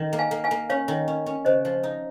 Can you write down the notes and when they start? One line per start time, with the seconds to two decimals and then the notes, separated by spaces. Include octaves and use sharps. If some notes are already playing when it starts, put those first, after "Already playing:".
Already playing: D#3
0.13 A#3
0.19 F5 G#5
0.31 A#3
0.44 F5 G#5
0.51 A#3
0.70 C#4 C#5 F5
0.88 D#3
1.08 C#4
1.26 C#4
1.45 C#3 C5 D#5
1.65 F3
1.83 D#4